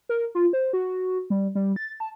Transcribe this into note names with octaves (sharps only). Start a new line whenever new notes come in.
A#4
F4
C5
F#4
G3
G3
A6
A5